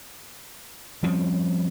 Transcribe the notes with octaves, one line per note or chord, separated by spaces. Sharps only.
F3 G3 C4 C#4